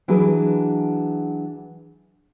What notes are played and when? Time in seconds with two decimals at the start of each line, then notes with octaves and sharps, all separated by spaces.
0.08 E3 F#3 D4 F#4 G#4 B4